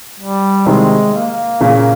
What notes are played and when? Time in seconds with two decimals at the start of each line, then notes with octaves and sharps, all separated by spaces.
0.20 G3
0.66 C3 D#3 G#3
1.14 A#3
1.60 A#2 C#3